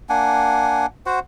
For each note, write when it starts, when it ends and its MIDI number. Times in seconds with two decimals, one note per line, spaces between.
0.09 0.86 58
0.09 0.86 62
0.09 0.86 78
0.09 0.86 80
1.06 1.20 66
1.06 1.20 72
1.06 1.20 78